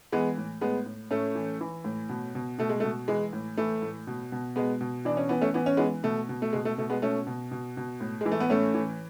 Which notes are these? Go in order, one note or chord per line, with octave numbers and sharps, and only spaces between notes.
E3 G#3 B3
A2
A2 G#3 B3
A2
A2 A3 C#4
E3
E3
A2
B2
B2
B2 A3
G#3
A3
B2
E3 G#3
A2
E3 A3
A2
B2
B2
B2 G#3 B3
B2
E3 D4
C#4
E3 B3
A3 C#4
E3 B3
C#4
E3 G#3 B3
B2 A3
B2
A3
B2 G#3
A3
B2 A3
G#3 B3
B2 A3 C#4
B2
B2
B2
A2
E3 G#3
A3
B3
A2 A3 C#4
E3